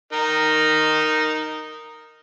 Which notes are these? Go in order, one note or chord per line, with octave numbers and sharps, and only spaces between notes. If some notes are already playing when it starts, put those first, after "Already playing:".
D#4 A#4